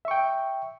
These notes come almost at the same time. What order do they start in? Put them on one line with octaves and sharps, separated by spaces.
E5 C#6 G5